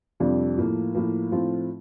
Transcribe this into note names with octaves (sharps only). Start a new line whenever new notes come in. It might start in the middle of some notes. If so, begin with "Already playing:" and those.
F2 C3 G3 D4 F4
A2 F3 A#3
A2 F3 A#3
A2 F3 C4 F4